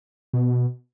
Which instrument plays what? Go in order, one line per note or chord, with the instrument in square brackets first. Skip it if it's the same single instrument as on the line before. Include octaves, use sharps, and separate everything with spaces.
[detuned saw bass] B2